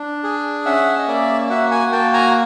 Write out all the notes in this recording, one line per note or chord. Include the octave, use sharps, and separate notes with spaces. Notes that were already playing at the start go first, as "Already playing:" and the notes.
Already playing: D4
G#4
C#4 E5 F#5
D#5
A#3 D5 E5
F#4 E5 F#5
F#5 G#5
A#3 G5 A5
G#5 A#5